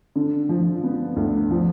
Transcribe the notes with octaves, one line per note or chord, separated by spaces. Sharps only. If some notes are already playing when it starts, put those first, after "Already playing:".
D3
F3
B3
D2
F3